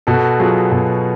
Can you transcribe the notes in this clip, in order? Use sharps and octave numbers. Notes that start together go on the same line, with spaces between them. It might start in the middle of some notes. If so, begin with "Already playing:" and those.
B2 F#4 A4
F#3 F4 G#4
B2